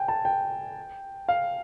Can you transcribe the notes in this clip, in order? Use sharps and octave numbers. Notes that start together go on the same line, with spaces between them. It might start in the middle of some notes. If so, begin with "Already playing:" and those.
Already playing: G5 G#5
A5
G5
F5